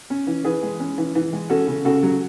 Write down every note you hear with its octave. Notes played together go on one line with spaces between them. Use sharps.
C#4
E3
E3 G#4 B4
G#3
C#4
E3
E3
G#3
C#4 F#4 A4
C#3
C#3 F#4 A4
F#3